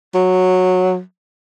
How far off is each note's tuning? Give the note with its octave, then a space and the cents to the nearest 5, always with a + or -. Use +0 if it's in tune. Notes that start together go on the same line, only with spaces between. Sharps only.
F#3 -10